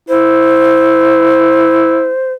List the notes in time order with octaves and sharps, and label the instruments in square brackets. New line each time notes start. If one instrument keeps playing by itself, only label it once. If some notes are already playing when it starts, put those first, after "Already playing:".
[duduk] E4 [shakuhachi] C5